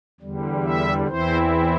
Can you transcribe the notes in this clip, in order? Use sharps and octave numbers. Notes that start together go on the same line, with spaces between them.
E2 D3 G3
E5
E2 E3 C4 E4 C5